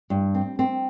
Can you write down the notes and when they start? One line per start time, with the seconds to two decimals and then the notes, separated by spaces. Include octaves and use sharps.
0.10 G2
0.35 C4
0.59 C4